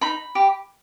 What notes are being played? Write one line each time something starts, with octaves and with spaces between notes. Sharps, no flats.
D#4 B5
G4